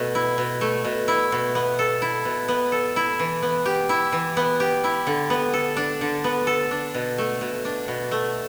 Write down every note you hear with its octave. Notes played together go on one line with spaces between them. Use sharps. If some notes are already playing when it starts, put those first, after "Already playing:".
Already playing: B2 A3
E4
B2
A3
B2
E4
B2
B3
A4
E4
B2
B3
A4
E4
E3
B3
G4
E4
E3
B3
G4
E4
D3
B3
A4
D4
D3
B3
A4
D4
B2
A3
B2
D4
B2
A3